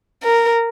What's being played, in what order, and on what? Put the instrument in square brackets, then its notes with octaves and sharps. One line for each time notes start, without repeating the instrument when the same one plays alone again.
[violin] A#4